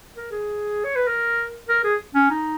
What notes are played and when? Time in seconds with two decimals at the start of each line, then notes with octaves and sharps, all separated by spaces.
0.17 A#4
0.31 G#4
0.84 C#5
0.96 B4
1.07 A#4
1.69 A#4
1.84 G#4
2.15 C#4
2.30 D#4